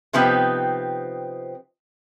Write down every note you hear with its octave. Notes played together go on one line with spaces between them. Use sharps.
C3 F3 B3 C4 D#4 G4